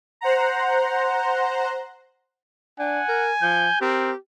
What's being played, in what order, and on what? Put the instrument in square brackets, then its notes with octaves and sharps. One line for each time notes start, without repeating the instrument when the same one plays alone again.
[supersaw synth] C5 F#5 A#5
[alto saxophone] D4 [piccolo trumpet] F#5 [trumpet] G#5
[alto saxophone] A#4
[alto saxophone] F3 [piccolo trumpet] G6
[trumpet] C4 [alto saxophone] G4 [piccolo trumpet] A#4